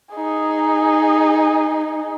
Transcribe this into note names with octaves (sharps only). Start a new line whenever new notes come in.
D#4 G#4